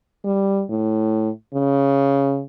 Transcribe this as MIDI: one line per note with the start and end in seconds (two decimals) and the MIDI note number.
0.25 0.62 55
0.69 1.30 45
1.54 2.42 49